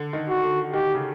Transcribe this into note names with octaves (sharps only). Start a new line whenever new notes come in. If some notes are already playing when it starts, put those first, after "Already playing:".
Already playing: D3
D#3
F#4
D3
D#3 G4
C#3